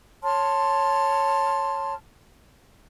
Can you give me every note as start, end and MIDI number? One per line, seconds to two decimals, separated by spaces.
0.23 1.94 73
0.23 1.94 81
0.23 1.94 84
0.23 1.94 89